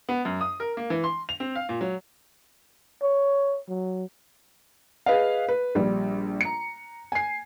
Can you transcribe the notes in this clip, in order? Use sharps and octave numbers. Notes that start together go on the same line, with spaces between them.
B3
F#2
D#6
A#4
A#3
E3
C6
F7
C4
F5
A#2
F#3
C#5
F#3
G#4 B4 D#5 F5
B4
A#1 G3
A#5 C#7
G#5 C7